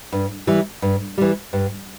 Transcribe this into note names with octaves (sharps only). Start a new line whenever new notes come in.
G2
E3 G3
G2
E3 G3
G2